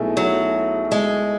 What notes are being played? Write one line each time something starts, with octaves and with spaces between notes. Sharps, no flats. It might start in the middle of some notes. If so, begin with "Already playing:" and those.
Already playing: B1 B2 A3 E4 G#4
F#3
G#3